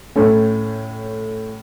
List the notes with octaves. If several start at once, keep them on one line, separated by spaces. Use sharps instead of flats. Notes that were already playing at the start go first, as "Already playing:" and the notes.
A2 A3 C#4 A4